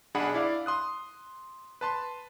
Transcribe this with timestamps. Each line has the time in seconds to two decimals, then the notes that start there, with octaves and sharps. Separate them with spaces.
0.15 B1 D4 G#4 F#5 B5
0.34 E4 D5 F5
0.66 C6 D#6 F#6
1.81 B4 A5 C6